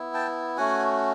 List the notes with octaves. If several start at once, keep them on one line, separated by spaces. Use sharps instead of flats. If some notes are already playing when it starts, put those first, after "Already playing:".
Already playing: B3 E4
G5 A5
A3 C#4 F#4 F#5 G#5